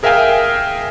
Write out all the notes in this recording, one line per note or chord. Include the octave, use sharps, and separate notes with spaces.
G#4 A#4 E5 F5 G5 G#5